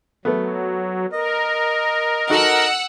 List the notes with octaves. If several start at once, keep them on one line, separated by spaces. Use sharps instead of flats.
F#3 A3 B3
A#4 D#5
D#4 F#4 A4 F#5 E6